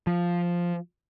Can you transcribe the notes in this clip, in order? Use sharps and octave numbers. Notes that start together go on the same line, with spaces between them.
F3